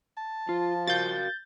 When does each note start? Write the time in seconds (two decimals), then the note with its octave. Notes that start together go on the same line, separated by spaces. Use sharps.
0.17 A5
0.49 F3 F4
0.87 F#4 A#4 F5 G6 A6